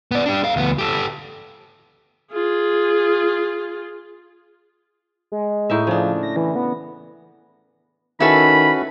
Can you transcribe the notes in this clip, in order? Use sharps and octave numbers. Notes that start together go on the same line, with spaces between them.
B3 D5
D4 G4
A4 F5
D2 B3
G4 A4
F4 G#4
G#3
A2 D#4 E5
C#3 F3 D4
A#6
E3
B3
D#3 C#4 E4 F#4 A4 B4 G#5 B5